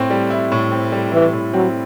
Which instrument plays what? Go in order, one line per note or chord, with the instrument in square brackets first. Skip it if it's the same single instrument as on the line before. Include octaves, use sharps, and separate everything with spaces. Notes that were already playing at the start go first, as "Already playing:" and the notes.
Already playing: [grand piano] A2 C4
G3
E4
A2
C4
G3
[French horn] E3 [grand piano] E4
[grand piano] A2
[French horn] F#3 [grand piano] C4